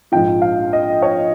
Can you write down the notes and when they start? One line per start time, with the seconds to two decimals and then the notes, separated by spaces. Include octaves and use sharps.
0.12 A#1 G#2 F3 G5
0.42 F5
0.73 D#5
1.02 C#5